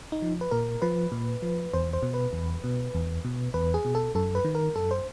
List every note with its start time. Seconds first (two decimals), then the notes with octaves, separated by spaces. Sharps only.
0.12 D#4
0.22 F3
0.41 B4
0.51 A#2 A#4
0.82 F3 B4
1.12 A#2
1.42 F3
1.74 E2 C5
1.93 C5
2.03 B2
2.14 B4
2.33 E2
2.64 B2
2.94 E2
3.25 B2
3.54 E2 B4
3.74 G#4
3.85 B2
3.95 A4
4.15 F#2 A4
4.35 B4
4.45 D#3
4.55 A#4
4.76 F#2 A4
4.91 C5